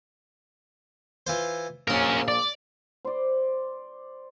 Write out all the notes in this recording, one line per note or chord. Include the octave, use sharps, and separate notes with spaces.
E3 F4 C5
A#1 C#4 A#4 C6
D5
C5 D5